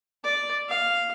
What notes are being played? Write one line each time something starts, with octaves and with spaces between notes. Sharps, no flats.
D5
F5